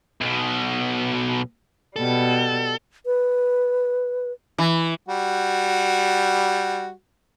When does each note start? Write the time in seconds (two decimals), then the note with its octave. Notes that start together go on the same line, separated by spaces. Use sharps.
0.21 B1 B2
1.96 B2 G3 A4
3.06 B4
4.58 E3
5.08 G3 F#4